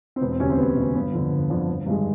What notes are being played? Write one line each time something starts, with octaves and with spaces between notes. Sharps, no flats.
C4
E1 B3
C4
D2 C3 C#4
C4
E1 B3
D2 C3
G1 B3
F2 D3
G1
F2 D3
G1
G2 D#3 G#3